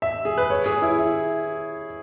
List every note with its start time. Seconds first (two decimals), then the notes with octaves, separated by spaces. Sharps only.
0.02 E5
0.25 G#4
0.38 B4
0.50 C#5
0.66 G#4
0.82 E4
0.98 E4